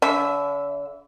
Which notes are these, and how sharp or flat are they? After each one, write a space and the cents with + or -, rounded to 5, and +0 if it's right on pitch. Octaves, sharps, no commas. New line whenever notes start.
D3 -45 E5 +0